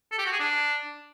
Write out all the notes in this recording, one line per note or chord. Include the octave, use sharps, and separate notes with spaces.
A4
G4
F#4
G#4
D4